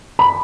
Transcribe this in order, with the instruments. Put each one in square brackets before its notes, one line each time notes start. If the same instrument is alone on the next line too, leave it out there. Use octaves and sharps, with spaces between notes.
[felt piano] B5